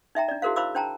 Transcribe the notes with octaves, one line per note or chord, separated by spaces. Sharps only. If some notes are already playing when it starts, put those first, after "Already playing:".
D#4 E5 G5 A#5
D4 D5
E4 F#4 G#4 A#4 C5 F5
E4 C5 F5 B5 D6 E6
D4 C5 G5 A5 A#5